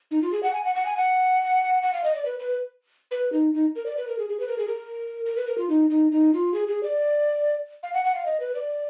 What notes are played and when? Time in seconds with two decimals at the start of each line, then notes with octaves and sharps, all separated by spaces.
0.11 D#4
0.22 F4
0.32 G#4
0.43 F#5
0.54 G#5
0.65 F#5
0.75 F#5
0.86 G#5
0.97 F#5
1.83 F#5
1.93 F5
2.04 D#5
2.15 D5
2.26 B4
2.39 B4
3.11 B4
3.33 D#4
3.54 D#4
3.76 A#4
3.86 D5
3.97 B4
4.07 A#4
4.19 G#4
4.29 G#4
4.40 B4
4.49 A#4
4.58 G#4
4.68 A#4
5.25 A#4
5.37 B4
5.47 A#4
5.58 F4
5.69 D#4
5.90 D#4
6.12 D#4
6.33 F4
6.54 G#4
6.68 G#4
6.83 D5
7.83 F5
7.94 F#5
8.05 F#5
8.15 F5
8.26 D#5
8.40 B4
8.55 D5